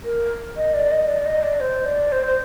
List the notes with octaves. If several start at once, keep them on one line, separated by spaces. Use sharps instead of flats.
A#4
D#5
D5
D#5
D5
D#5
D5
C5
D5
C5
C5